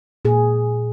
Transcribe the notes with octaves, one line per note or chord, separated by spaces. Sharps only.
A#2 G#4